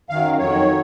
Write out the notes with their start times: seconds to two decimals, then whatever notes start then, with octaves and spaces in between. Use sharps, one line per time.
0.10 F#2 D#3 F#3 F5
0.39 F2 D#3 F#3 C#5
0.68 F#3